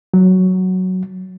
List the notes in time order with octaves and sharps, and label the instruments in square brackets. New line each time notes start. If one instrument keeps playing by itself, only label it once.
[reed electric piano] F#3